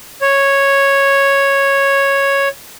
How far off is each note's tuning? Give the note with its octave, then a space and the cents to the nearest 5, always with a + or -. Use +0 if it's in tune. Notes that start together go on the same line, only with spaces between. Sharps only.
C#5 -5